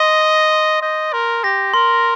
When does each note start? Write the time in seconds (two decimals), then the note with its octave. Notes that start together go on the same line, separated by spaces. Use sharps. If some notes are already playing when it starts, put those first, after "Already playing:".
Already playing: D#5 C6
0.22 A#6
0.52 C6
0.82 D#5 G6
1.13 A#4 C6
1.43 G4 A#6
1.74 A#4 C6